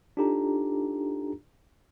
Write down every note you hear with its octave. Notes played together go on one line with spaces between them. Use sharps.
D4 D#4 F4 G4 A4 A#5